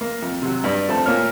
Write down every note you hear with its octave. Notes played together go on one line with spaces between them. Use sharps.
A#3
F2
C3 F#3
G2 D5
F2 A3 C4 A5
A#2 A#3 C#5 F6